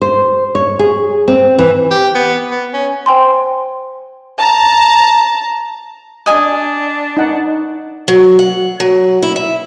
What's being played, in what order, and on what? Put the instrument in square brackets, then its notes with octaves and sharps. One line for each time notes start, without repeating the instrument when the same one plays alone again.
[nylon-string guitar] C5
C#5
G#4
C4
E3
[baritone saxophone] G4
B3
B3
C#4
[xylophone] C5 G5 G#5 C6
[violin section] A5 A#5
[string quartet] D4 [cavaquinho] D#5 G#5 A5
[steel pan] D#4 F#5
[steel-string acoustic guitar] F#3
F#5
F#3
E4
E5